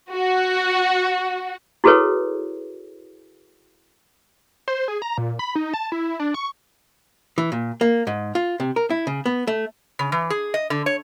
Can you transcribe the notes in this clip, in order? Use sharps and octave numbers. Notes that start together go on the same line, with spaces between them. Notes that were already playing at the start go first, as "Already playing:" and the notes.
F#4
E4 F#4 G#4 A4 B4 C#5
C5
G#4
A#5
A#2
B5
D#4
A5
E4
D4
C#6
E3
A#2
A#3
G#2
F4
C3
A#4
E4
C#3
B3
A3
C#3
E3
G#4
D#5
D3
C#5